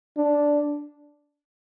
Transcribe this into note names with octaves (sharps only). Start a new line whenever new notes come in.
D4